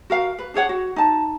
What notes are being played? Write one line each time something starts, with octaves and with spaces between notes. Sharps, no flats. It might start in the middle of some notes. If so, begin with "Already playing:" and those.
F#4 A#4 F5
B4
D4 G#4 C#5 F#5
F#4
D#4 A5